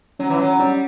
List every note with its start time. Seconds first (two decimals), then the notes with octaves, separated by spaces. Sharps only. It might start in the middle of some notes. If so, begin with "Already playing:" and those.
0.19 F#3 C#4
0.30 E3
0.40 F#3 C#4
0.59 G3 C#4